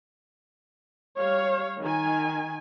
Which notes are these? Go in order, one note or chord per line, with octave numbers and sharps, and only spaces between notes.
G3 C#5 F5
D#3 G#5